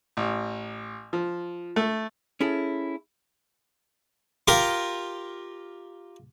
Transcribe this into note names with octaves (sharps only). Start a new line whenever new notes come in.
A1
F3
A3
C#4 E4 G#4 A4
F4 G4 A#4